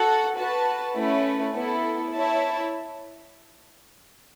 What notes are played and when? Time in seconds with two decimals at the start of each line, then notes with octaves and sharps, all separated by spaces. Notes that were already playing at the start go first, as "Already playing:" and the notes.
Already playing: F#4 A4 F#5
0.37 F#4 B4 A5
0.96 A3 C#4 E4 B4
1.54 B3 E4 A4
2.13 E4 C#5 E5 A5